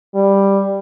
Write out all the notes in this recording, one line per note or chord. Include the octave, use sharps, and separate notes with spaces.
G3